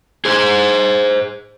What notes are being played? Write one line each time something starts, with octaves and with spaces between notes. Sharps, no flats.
G#4 C5